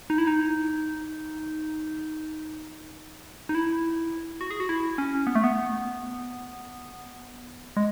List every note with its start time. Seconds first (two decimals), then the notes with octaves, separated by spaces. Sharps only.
0.10 D#4
0.18 E4
0.27 D#4
3.49 D#4
3.55 E4
4.41 F#4
4.51 G#4
4.60 F#4
4.69 E4
4.98 C#4
5.27 B3
5.35 A3
5.44 B3
7.77 G#3